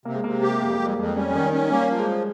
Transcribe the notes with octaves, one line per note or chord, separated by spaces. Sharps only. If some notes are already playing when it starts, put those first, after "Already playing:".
C3 A#3
G#3
C3 A#3
G4
F2 A#3
G#3
F2
G3
F2 G#3
G3 C#4
D#3
C#4
G3 A#3
F3
G#3